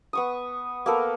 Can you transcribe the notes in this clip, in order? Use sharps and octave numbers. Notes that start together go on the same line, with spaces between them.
B3 C#6 D#6
A#3 B3 A4 A#4